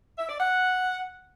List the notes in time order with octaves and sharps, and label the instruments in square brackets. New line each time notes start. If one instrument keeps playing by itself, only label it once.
[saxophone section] E5
D5
F#5